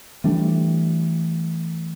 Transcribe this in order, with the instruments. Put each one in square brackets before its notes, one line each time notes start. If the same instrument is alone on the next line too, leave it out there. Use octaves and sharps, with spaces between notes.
[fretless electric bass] E3 G3 A3 D4